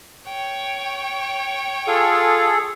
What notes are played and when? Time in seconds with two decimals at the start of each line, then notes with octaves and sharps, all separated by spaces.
0.25 C#5 G5
1.88 F4 G#4 A4